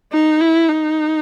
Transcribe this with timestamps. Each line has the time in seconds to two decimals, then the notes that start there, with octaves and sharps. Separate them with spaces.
0.13 D#4
0.41 E4
0.68 D#4